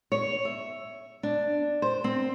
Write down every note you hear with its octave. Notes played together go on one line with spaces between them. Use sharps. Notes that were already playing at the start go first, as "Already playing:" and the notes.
C#5
E5
D4
C5
C4